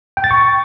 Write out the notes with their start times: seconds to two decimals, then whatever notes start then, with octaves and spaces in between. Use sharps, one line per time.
0.17 G5
0.24 A6
0.31 C#6